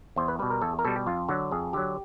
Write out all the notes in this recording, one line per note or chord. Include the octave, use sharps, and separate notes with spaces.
E2 C5
B4
B2 G3 B4
A#4
E2 A4
A#4
B2 G3 A4
G4
F2 F4
D3 F#3 F#4
F2 G#4
D3 F#3 G4